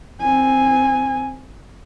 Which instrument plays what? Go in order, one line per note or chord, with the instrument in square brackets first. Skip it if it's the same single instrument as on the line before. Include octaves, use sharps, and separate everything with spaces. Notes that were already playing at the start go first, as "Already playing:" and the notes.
[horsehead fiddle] C4 G#5